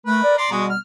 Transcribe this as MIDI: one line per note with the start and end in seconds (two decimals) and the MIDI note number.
0.06 0.20 57
0.06 0.33 70
0.06 0.33 71
0.23 0.35 74
0.38 0.50 74
0.38 0.50 82
0.38 0.47 84
0.51 0.74 47
0.51 0.74 55
0.51 0.64 56
0.51 0.74 59
0.51 0.64 66
0.69 0.78 89